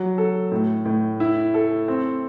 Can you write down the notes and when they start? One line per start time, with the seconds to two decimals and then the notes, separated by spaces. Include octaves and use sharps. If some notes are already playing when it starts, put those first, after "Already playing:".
Already playing: F#3
0.18 A4
0.52 A2
0.85 A2
1.20 E4
1.54 A4
1.88 C4